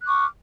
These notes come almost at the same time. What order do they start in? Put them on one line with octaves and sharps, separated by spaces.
F#6 D6 C#6 F6